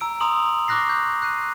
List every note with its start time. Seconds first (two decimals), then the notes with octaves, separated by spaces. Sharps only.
0.01 A#5 E6 D7
0.20 A#5 C6 D#6 F7 F#7
0.68 C#6 D6 F6 F#6 A#6 C7
0.89 G6
1.22 F#6 C7 D#7